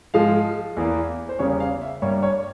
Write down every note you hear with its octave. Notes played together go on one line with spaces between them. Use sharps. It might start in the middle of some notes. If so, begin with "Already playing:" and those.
G#2 F3 G#3 F5
E2 E3 A#3
C5
E2 C#3 G3 A#3 C#5
F5
E5
G2 G3 A#3 C#5
C#5